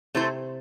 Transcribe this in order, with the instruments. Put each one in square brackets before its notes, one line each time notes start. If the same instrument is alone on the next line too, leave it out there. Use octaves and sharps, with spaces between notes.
[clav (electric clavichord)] C3 [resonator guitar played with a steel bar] A3 C4 E4 A4 C5